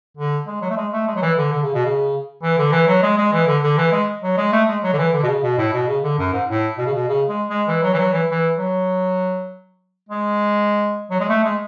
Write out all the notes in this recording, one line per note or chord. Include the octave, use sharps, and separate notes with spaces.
D3
G#3
F#3
A3
G#3
A3
G#3
F#3
E3
D3
D3
C#3
B2
C#3
E3
D3
E3
F#3
G#3
G#3
E3
D3
D3
E3
G#3
F#3
G#3
A3
G#3
F#3
D3
E3
D3
B2
C#3
B2
A2
B2
C#3
D3
F#2
G#2
A2
B2
C#3
B2
C#3
G#3
G#3
E3
F#3
E3
F#3
E3
E3
F#3
G#3
F#3
G#3
A3
G#3